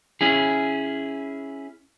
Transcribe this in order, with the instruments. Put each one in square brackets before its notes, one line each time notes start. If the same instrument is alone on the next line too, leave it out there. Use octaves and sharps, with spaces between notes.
[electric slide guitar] C#4 E4 G#4